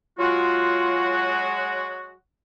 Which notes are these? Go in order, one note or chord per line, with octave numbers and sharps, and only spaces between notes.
F#3 G#3 F4 F#4